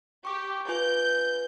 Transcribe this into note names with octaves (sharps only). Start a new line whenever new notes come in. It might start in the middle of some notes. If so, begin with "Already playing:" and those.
G4 C#6 D6
F4 B4 G#5 G6